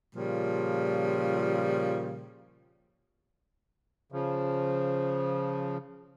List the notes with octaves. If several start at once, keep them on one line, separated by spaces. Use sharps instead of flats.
A#2 C#3 F3 G3
C#3 F3